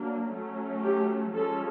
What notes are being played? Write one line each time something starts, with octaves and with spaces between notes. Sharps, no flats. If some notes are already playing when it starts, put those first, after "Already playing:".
Already playing: F#3 A#3 D4
F#3 A3 C#4
G4
F3 G#3 C#4 A4